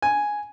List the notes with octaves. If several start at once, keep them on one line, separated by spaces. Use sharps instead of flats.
G#5